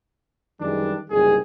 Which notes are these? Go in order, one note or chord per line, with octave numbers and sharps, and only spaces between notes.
F#2 D#3 E3 G3 G#3 D4
F#1 C2 D#3 G#4